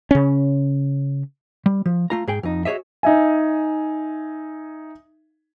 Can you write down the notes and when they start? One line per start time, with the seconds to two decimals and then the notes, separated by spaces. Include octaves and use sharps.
0.11 C#3 C#4
1.66 G3
1.86 F3
2.10 A3 F4 A#5
2.27 G#2 G#4 G5
2.43 F2 D#4
2.65 F#4 G#4 C#5 D#5 E5
3.03 D#4 E5 G#5